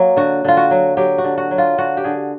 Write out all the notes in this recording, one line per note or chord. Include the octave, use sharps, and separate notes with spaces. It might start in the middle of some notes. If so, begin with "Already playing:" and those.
Already playing: F#3 A#3
D3 F#4
D3 F4
F#4
F#3
F#3 G4
F#4
D3
F#4
F#3
F4
D3 F#4
G4
D3 G#4